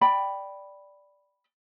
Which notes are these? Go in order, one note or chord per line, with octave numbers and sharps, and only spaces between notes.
D5 G5 B5